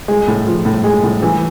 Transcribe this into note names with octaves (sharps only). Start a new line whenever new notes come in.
G#3
A2
F3
A2
G#3
A2
E3